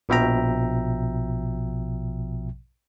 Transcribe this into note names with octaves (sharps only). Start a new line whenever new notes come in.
A#1 B2 F3 E5 G5 A#5